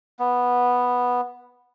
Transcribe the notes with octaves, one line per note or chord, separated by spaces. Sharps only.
B3